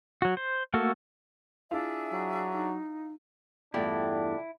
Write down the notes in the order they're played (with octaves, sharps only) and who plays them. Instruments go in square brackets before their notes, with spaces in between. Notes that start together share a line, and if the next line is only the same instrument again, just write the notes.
[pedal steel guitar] F#3 F#4
C5
A3 A#3 F#4 A4
[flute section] D4 G#4 E5 [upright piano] E4 F4 F5
[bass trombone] F#3
[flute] D#4
[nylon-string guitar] E2 G2 A3 [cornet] D4 [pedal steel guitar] E4 [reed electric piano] F4 D5 G5